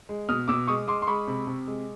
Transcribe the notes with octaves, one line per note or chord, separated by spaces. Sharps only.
G#3
B2 D#6 F6
B2 D6 E6
G#3 C#6 D#6
G#3 C6 D6
C6
G#3 B5 C#6
C3
C3
G#3